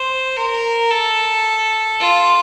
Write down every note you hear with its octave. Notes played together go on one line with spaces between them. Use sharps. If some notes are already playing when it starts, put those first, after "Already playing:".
Already playing: C5
A#4
A4
F4